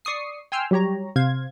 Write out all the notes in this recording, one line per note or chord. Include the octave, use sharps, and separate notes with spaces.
D5 C#6 D#6 C7
G5 G#5 C6 E6 F6
F#3 G3 G4 C#5 A#5
C3 C5 F5 G#6